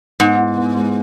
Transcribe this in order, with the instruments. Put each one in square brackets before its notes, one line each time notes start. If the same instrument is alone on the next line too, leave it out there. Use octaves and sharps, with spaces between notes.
[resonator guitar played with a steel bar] G#2 [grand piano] B3
[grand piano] E4
B3
G#3